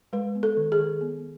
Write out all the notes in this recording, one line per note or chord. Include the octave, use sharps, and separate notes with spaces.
G#3 B4
B3
A4
D#3
G#4
D#3
B3